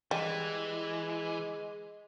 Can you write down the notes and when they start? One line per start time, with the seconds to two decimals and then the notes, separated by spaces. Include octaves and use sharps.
0.11 E3 G3 G#3